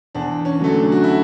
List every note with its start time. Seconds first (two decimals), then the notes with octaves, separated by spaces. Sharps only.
0.15 E2 D4
0.45 C#4
0.60 D3 F#3 A3
0.75 D4
0.92 F#4
1.04 E4